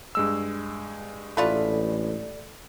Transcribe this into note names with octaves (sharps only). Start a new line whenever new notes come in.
G2 G#3 E6
A1 A3 F4 A4 B4 D5 B5